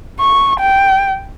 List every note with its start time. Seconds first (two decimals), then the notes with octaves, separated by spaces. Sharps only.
0.20 C#6
0.60 G5